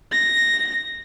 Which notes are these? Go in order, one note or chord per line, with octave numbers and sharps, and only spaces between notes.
A#6